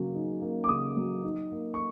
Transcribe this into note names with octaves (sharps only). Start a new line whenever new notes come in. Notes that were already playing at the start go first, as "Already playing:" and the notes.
Already playing: C#3 F#3 A#3
D#4
A#3
D6
C#3 D#6
F#3
D#4
A#3
C#6